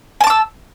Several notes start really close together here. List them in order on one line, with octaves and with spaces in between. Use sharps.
G#5 A5 D6 E6